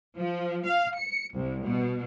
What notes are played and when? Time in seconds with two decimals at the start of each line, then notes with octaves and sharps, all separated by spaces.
0.16 F3
0.67 F5
0.99 C#7
1.35 C2
1.64 B2